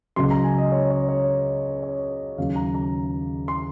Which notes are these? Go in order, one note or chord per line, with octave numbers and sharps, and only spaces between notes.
C#2 C#3 F#3 C6
A#5
G#5
D#5
C#5
C#5
C#5
C#5
D#2 C#3 F#3 F5
A#5
A#5
C6